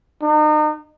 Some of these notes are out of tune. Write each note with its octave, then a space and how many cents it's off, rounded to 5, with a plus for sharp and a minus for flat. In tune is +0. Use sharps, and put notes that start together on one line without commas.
D#4 -35